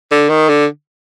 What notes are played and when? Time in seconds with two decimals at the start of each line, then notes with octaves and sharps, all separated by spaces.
0.11 D3
0.29 D#3
0.49 D3